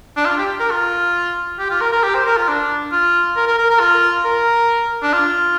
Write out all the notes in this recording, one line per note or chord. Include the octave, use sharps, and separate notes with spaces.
D4
F4
G4
A#4
F4
G4
F4
A#4
A#4
G4
C5
A#4
F4
D4
F4
A#4
A#4
A#4
A#4
F4
A#4
D4
F4